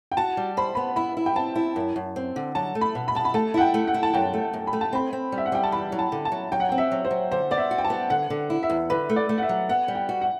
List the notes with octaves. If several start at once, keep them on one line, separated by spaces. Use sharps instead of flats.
G5
F#4 A5
G3
C5 B5
B3 B5
E4 B5
E4
G5
C4 A5
E4
F#2
F#2
C4
D3
F#3 A5
A3
B5
B2
B5
B2 A5
B5
A3 A5
E4 F#5
G5
A3
F#5
E4
A5
F#2 G5
A3
F#2
B5
A3
A5
C4 B5
C4
G3
E5
F#5
G3 G5
A5
E2 B5
F#3
A5
D3
A5
F#3
F#3 G5
F#5
C4 G5
E5
F#3
C5
F#3
D3 C5
B3 D5
E5
F#4
G5
A5
B3
D3 F#5
D3
E4
E5
E2
D3 B4
A3
D5
A3
F#5
E5
F#3
B3 F#5
G3
G5
F#4
F#5